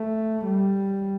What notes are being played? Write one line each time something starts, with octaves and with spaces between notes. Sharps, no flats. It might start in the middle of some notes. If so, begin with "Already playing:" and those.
Already playing: A3
G3